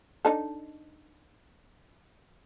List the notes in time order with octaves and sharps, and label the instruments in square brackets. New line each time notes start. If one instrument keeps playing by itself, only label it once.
[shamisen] D4 D#4 A4